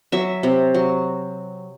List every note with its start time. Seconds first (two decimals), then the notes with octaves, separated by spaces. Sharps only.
0.12 F#3 E5
0.43 C3
0.74 F#3